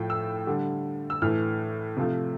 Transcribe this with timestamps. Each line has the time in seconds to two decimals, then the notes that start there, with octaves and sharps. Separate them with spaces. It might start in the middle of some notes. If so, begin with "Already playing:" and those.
Already playing: A2 F3 A3 G5
0.10 E6
0.47 D3 G3
1.10 E6
1.22 A2 E3 A3 F6
1.97 C3 F3 A3